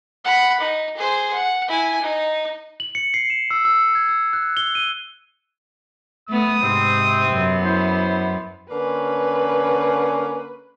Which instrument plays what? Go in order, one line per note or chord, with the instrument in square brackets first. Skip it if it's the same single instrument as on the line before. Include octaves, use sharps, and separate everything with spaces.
[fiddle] F#5 B5
D#4
G#4 C5
F#5
E4 G#5
D#4
[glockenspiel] F#7
C#7
C7
E7
E6
E6
C#7
G#6
E6
F#6
G7
D#7
[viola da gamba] A3 B3 [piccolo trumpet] D#6
[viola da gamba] G#2 [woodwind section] C3 C4
[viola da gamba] F#2 B3
[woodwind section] E4 C5
[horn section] D3 A#3 C#4 [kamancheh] B4